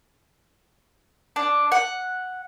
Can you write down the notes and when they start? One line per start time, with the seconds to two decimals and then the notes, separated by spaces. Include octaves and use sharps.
1.36 D4
1.72 F#5